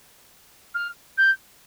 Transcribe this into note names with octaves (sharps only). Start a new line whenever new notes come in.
F6
G6